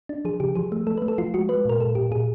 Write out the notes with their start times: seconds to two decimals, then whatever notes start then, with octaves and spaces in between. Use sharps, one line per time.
0.09 D4
0.25 F3 G#4
0.40 C#3 G4
0.56 F3 G#4
0.72 A3
0.87 A3 A4
0.98 B4
1.02 A3
1.08 A4
1.18 F3 F4
1.34 G#3 F#4
1.49 G#3 B4
1.65 A#2 A#4
1.80 A#2 A4
1.95 A#2 G4
2.11 A#2 G#4